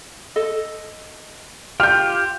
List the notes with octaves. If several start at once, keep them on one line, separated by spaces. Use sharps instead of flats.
A4 D#5
F4 G4 F6 G6